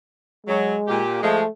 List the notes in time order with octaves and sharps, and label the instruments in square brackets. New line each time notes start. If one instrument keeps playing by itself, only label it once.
[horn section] F#3 [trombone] G#3
[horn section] A#2 G4
[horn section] F3 G#3 [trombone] A3